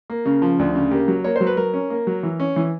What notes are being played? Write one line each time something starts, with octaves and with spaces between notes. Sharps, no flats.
A#3
C#3
F3
D2
C#3
A#3 G4
F#3
A#3 C#5
F#3 C5
B4
F#3 A#4
C#4
A#3
F#3
E3
C#4
E3